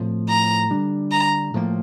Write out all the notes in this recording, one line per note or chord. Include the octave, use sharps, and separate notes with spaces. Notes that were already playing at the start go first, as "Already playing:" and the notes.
Already playing: A2 F3 C4
A#5
D3 G3 D4
A#5
A2 F3 A#3